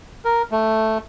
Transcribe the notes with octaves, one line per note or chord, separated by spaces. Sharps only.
A#4
A3